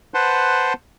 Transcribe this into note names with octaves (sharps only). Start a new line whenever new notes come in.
B4 C5 F#5 A5 C6